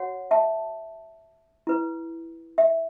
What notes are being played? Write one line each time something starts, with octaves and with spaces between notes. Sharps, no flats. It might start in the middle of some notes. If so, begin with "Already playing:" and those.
Already playing: F#4 C#5 F#5
E5 A5
E4 B4
E5